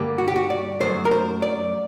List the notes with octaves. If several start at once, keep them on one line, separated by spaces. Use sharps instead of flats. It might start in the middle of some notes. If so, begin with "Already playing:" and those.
Already playing: G2 D3 G3 A#3
F#4
G4
F#4
D5
F#2 F#3 A3 C5
A#4
C5
D5